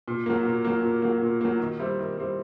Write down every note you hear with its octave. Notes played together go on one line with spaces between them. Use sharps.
A#2
F#3 A#3
A#2
F#3 A#3
A#2
F#3 A#3
A#2
F#3 A#3
D#3
G3 C4 E4
D#3
G3 C4 E4